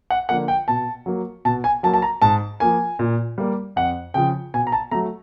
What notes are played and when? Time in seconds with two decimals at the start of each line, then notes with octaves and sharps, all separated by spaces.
0.10 F#5
0.29 D3 F3 A#3 F#5
0.48 G5
0.68 B2 A5
1.06 F#3 A#3
1.45 B2 A5
1.64 G#5
1.83 F#3 A#3 A5
1.94 A5
2.02 A#5
2.22 G#2 A5
2.60 F3 A#3 G#5
2.99 A#2
3.38 G3 A#3
3.76 F2 F#5
4.14 C#3 F3 G5
4.54 B2 G#5
4.67 A#5
4.72 A5
4.91 F#3 A3 A#5